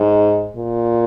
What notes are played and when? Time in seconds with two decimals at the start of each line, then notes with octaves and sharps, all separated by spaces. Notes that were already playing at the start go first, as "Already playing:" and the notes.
Already playing: G#2
0.56 A#2